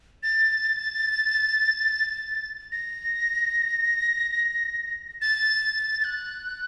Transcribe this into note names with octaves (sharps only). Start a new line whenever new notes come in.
A6
A#6
A6
A6
F#6